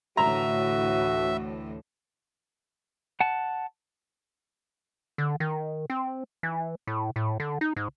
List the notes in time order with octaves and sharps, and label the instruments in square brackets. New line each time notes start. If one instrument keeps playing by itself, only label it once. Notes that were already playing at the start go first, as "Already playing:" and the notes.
[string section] D2 A2 E3 [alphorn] F#4 [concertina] E5 [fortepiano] A#5
[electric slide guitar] F#5 A5
[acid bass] D3
D#3
C4
E3
A2
A2
D3
D#4
G#2